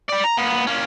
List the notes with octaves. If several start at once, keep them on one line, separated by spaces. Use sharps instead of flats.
G3 D5
A#5
A#2 B3
A#3 C#4